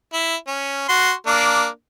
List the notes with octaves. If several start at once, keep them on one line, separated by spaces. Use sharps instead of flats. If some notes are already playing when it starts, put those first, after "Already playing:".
E4
C#4
F#4 C6
A#3 D4